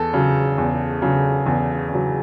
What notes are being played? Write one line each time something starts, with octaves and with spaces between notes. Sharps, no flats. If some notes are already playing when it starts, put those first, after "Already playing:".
Already playing: E2 A4
C#3 F#3
E2
C#3 F#3
E2
C#3 F#3